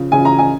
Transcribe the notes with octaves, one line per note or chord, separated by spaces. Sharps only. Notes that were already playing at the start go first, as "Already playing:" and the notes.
Already playing: C#3 F3
C#3 F3 G#5
A#5
G#5